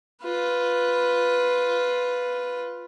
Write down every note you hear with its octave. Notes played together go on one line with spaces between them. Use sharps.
F4 B4